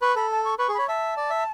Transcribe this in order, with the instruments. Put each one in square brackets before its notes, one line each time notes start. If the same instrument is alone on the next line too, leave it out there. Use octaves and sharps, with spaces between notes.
[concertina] B4 [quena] C#6
[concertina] A4 [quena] B5
[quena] A5
C#6
[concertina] B4 [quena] C#6
[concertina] G#4
[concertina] C#5 [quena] B5
[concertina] E5 [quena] A5
[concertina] D5
E5